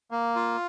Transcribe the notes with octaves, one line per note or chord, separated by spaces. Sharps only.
A#3
F4